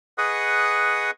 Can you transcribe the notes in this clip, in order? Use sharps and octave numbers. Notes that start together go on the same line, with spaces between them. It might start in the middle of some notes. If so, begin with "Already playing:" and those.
G#4 B4 D#5 F#5 C#6 D#6